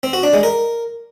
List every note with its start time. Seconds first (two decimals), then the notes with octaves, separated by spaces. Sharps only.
0.03 C4
0.13 F#4
0.23 D4
0.33 G#3
0.43 A#4